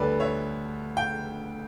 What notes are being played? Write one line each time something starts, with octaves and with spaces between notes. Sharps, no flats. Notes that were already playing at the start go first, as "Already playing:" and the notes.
Already playing: D2 D3 G3 A4 B4 C#5 D5
C#5 E5
G5